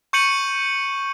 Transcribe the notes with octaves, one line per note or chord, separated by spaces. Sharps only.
C#6 G6 C#7 D#7 F#7